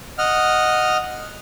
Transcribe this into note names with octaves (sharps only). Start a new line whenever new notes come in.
D#5 F#5 F6